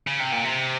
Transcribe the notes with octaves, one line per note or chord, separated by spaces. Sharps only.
C#3
C3
A#2
C3